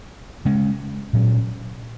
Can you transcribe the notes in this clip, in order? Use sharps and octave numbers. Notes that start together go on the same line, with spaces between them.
C#3 G#3 C#4
A#2 F#3 C#4